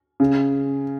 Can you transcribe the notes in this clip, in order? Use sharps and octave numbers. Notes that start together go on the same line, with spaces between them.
C#3